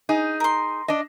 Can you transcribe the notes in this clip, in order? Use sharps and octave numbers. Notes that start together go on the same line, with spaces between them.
D#4 G#4
A#4 C6
D4 D#5